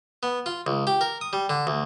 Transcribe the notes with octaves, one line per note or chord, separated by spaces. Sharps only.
B3
F4
C#2
G4
A#4
D#6
G3
D3
D2